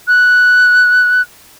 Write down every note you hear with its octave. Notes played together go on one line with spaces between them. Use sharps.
F#6